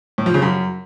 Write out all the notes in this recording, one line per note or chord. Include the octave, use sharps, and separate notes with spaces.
A2
F3
C#3
F#2